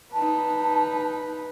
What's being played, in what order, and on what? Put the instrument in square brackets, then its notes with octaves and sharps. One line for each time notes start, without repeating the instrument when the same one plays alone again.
[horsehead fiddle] D#4 B4 [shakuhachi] A5